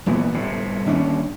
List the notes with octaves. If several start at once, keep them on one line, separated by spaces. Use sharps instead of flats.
A#1 A#2 E3 B3
G1 A2 C3
G1 D#2 C#4 D4